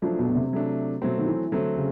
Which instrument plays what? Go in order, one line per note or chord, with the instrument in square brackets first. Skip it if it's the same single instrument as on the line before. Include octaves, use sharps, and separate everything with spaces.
[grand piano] F3 [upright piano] F#3 A3 D4
[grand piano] B2
B2
C3
[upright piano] F#3 A3 D4
[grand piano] B2 [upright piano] F#3 A3 C4
[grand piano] D#3
E3
[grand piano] D3 [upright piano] F#3 A3 C4
[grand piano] C#3